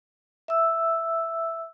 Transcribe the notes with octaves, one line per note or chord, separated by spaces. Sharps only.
E5 E6